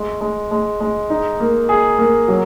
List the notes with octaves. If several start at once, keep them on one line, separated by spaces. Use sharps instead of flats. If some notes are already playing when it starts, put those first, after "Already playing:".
Already playing: G#3
G#3
G#3
G#3
D#4
A#3
G#4
A#3
F#3